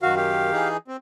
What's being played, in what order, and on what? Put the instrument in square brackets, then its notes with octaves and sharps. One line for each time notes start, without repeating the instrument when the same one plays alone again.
[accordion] F#2 D#3 [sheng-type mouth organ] F#4 F5
[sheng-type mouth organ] G4 F5
[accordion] E3 D#4 G#4
C4